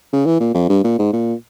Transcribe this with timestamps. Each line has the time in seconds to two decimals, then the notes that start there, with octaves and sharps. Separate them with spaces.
0.13 C#3
0.26 E3
0.40 A#2
0.54 F2
0.69 G2
0.84 A#2
0.99 G#2
1.13 A#2